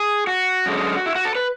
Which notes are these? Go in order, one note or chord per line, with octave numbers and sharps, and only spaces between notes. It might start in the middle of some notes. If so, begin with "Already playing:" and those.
Already playing: G#4
F#4
F#2 D3 G#3
E4
F#4
A4
B4